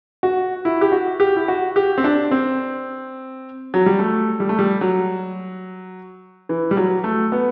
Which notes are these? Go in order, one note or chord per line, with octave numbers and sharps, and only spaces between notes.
F#4
E4
G4
F#4
G4
E4
F#4
G4
C4
D4
C4
F#3
G3
A3
G3
A3
G3
F#3
E3
G3
F#3
A3
B3